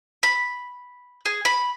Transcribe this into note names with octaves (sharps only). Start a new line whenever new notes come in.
B5
G#4
B5